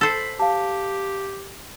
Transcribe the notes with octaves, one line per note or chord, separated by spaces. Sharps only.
A4 C5 B5
G4 F5 A5